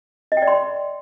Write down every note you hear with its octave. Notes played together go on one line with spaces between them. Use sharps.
D#5
G5
D5
C6